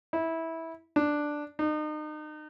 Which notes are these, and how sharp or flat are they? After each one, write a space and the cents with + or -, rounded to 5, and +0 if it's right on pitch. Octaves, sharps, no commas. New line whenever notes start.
E4 -15
D4 +5
D#4 -35